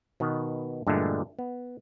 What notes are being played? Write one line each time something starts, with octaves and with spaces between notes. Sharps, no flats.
B2 D#3 B3
G2 A#2 D3 E3 G#3 A3
B3